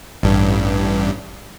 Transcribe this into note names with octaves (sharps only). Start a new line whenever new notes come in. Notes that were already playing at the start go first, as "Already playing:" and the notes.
A1 G2